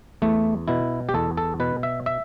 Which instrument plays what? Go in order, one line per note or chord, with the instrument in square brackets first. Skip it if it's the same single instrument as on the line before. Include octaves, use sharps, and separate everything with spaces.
[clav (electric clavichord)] E2 A3
B2 E4
G4
E2 A4
A4
B2 B4
E5
E5